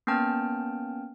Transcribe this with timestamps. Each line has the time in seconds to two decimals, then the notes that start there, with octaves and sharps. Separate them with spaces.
0.07 A#3 B3 C#4 G5 A5 F6